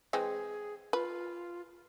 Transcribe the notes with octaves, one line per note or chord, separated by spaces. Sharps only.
E3 G#3 C4 G#4
F4 B4